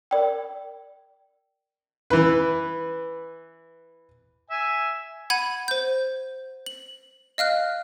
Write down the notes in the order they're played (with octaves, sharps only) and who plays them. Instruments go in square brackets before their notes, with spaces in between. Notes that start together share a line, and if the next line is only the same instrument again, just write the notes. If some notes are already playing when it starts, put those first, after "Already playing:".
[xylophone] A#4 D5 G5
[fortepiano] E3 B4
[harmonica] E5 G#5
[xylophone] F#5 B5 G#6 D#7
C5 G6
F#7
D#5 F5 F6 F#6